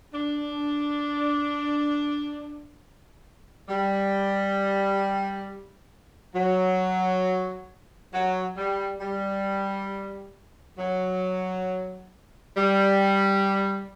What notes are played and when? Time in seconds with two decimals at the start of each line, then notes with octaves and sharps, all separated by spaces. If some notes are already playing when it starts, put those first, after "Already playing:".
0.14 D4
3.69 G3
6.35 F#3
8.13 F#3
8.57 G3
9.01 G3
10.78 F#3
12.57 G3